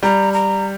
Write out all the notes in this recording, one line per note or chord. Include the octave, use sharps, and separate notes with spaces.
G3 A#5
A#5